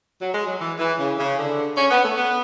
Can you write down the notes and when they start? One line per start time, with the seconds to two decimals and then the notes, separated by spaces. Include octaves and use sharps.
0.20 F#3
0.33 G#3
0.46 F#3
0.60 E3
0.79 E3
1.00 C#3
1.18 C#3
1.38 D3
1.77 C#4
1.91 B3
2.04 A3
2.16 B3